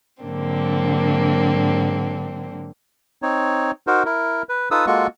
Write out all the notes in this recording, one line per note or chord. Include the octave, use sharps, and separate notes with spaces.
G#2 D3 F#3 A#3 C4 D4
C4 D#4 C#5
D#4 F#4 A#4 C5
E4 A#4
B4
D#4 F4 A4 B4 D#6 E6
G#3 A#3 F4 F#4 A4 C#6